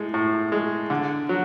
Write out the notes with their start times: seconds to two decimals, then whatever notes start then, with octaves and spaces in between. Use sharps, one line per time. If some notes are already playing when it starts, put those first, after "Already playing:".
Already playing: A2 G#3
0.14 A2
0.52 G#3
0.90 D3
1.29 F#3